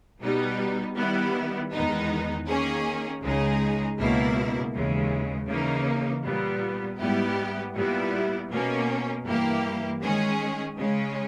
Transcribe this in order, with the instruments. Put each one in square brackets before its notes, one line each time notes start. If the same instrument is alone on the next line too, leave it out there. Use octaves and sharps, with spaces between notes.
[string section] B2 G3 B3 D#4
D#3 G3 B3 E4
E2 D#3 G#3 B3 D#4
D#3 A#3 C#4 G#4
C#2 C#3 G#3 D#4 G#4
C#2 B2 A#3 E4
D#2 C#3 E3 G#3
C#3 E3 A#3 D#4
A#2 G3 B3
G#2 G3 B3 E4 G4
A#2 G3 B3 E4
B2 A#3 C#4
G2 E3 A#3 E4 G4
D#3 G#3 C#4 G#4
C#3 G#3 C#4